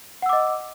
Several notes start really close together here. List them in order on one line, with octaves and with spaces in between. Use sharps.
F#5 E6 D6 D#5